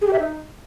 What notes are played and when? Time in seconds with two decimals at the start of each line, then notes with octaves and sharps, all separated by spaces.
0.01 G#4
0.07 G4
0.12 E5
0.18 D#4